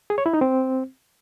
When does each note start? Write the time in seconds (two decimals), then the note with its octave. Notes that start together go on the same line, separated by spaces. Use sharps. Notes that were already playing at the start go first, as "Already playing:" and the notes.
0.10 G#4
0.18 C#5
0.26 E4
0.33 D#4
0.41 C4